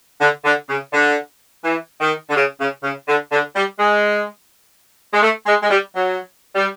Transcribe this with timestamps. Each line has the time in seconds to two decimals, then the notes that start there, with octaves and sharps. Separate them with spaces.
0.20 D3
0.45 D3
0.68 C#3
0.92 D3
1.64 E3
2.00 D#3
2.29 D3
2.35 C#3
2.59 C#3
2.83 C#3
3.08 D3
3.31 D3
3.55 G3
3.79 G#3
5.13 G#3
5.21 A3
5.46 G#3
5.62 G#3
5.70 G3
5.94 F#3
6.55 G3